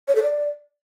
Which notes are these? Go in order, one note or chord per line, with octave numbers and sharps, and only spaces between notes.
C#5
A4
D5